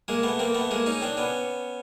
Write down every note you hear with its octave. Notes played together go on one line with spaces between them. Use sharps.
G#3 A#3
A3 B3
A#3 C4
A3 B3
G#3 A#3
C#4 D#4
C4 D4
B3 C#4